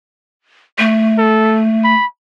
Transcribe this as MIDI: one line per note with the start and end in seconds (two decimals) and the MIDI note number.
0.79 1.94 57
1.18 1.61 69
1.84 2.06 83